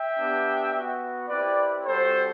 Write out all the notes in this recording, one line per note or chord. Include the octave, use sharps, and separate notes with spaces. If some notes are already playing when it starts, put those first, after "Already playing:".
Already playing: E5 G5
B3 D4 G4
B3 F#4
C4 E4 G4 B4 D5
G3 C4 F#4 A4 C5